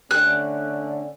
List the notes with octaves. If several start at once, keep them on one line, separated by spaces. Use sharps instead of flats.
D3 A3 C#4 F#6